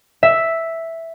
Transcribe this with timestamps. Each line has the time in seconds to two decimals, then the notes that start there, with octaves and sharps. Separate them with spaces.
0.23 E5